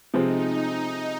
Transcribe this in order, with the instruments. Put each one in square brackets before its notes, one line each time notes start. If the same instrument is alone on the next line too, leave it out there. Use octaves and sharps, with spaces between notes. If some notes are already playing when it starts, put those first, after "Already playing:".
[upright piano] C3 F3 G#3 C4 [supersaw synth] D#4